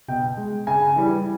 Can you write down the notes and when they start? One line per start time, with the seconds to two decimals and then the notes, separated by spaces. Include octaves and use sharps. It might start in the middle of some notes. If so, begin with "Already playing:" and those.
0.08 B2 G5
0.37 G#3
0.67 C#3 G#5
0.96 E3 G3